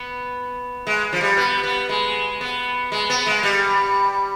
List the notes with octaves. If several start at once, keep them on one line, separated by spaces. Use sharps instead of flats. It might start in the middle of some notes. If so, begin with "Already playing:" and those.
Already playing: B3
G#3
F3
G3
B3
B3
G#3
B3
G#3
B3
G#3
G3